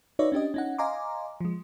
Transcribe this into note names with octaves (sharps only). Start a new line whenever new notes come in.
D#4 F#4 B4 C#5 D5 E5
C#4 D4 G4 D#5
C#4 D#4 F#5
D#5 F5 G#5 A#5 C6 D6
F3 G#3